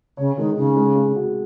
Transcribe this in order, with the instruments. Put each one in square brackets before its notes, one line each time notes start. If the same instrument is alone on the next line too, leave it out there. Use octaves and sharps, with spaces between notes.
[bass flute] C#3 [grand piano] C#5
[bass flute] D#3 [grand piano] G#3
[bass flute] C#3 [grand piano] D#4
[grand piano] G#3
G#3
F#4